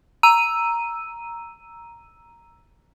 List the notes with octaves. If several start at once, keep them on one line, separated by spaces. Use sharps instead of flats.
A#5 E6 D#7